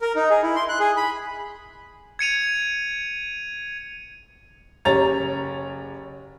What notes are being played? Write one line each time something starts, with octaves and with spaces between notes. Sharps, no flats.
A#4
D#4
G#4
E4
C6
F#6
G#4
B5
G#6 C#7 D#7 F7
F#1 G4 C#5 A#5 A6 F7